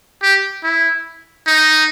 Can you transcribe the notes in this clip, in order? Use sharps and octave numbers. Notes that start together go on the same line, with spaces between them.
G4
E4
D#4